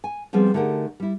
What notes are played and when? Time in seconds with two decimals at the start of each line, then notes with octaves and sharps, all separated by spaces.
0.04 G#5
0.33 F3 G3 B3 C4 G#4
0.54 D3 A3 D#4 G4 G#4 A#4
1.00 G3 E4